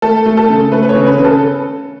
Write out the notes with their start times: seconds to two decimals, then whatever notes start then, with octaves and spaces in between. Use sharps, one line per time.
0.02 A3 A4
0.26 A3
0.37 A4
0.49 C#3
0.72 A3 B4
0.83 B4
0.89 C#5
0.95 C#3
1.07 B4
1.18 C#3
1.24 A4